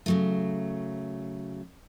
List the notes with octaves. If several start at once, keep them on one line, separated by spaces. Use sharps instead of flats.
C#3 F#3 A3